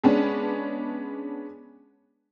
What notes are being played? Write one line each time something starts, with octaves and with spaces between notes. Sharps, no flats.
G#3 B3 C#4 D4